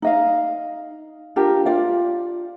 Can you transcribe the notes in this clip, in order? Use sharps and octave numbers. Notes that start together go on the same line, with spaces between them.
D#4 D#5 F5
D4 F4 G4 A#4
F4 D5 F5